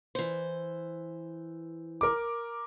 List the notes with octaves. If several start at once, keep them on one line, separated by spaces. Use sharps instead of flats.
E3 C5
A#4 D6